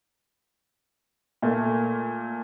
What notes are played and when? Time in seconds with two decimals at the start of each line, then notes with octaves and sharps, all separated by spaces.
1.42 A#2 A3 A#3